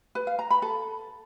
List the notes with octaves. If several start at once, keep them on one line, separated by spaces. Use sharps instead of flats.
B4
F5
A#5
B5
A4